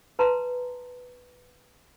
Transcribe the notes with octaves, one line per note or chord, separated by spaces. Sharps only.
B4 A5 A#5 C6